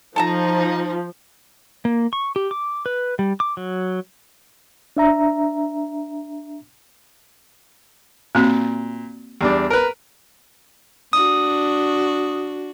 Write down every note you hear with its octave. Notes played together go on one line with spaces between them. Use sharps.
F3 D#4 A4 A5 A#5
A#3
C#6
G4
D6
B4
G3
D6
F#3
D4 E5 A#5
A#2 A#3 C4 F#4
E2 G3 D4
A#4 B4
D4 F#4 D#6